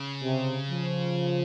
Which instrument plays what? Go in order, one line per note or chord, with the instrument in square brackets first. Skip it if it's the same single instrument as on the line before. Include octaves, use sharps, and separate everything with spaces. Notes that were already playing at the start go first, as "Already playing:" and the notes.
Already playing: [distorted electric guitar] C#3
[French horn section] C3
F3